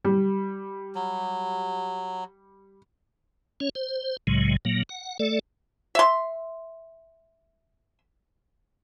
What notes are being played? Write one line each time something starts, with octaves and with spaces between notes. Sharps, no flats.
G3
F#3
C#4 C#5
C5
C2 A2 C#3 F#3 G#3
A#2 F#3 A#3
F#5
A3 A4 D5
E5 C6